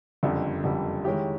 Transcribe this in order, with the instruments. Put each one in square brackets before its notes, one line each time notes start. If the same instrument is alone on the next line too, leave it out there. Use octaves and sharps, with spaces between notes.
[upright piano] F#1 F2 D3 G3
F#1 F2 D3 G3
D#3 G#3 C#4 E4 G4